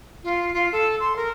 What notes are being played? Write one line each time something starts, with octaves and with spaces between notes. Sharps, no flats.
F4
F4
A4
C6
A#4